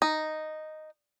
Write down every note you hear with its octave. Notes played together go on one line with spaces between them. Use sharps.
D#4